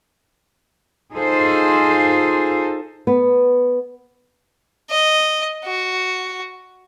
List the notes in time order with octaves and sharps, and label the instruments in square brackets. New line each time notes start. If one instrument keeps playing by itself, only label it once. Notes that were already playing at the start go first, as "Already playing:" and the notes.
[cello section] D#4 F4 G#4 A4 C5
[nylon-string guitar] B3
[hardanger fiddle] D#5
F#4